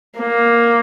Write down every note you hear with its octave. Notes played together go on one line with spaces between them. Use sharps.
A#3